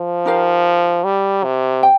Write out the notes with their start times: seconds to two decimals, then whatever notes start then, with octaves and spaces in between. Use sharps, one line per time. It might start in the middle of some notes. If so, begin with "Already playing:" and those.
Already playing: F3
0.26 D#4 G4 A#4 F5
1.04 G3
1.44 C3
1.83 G5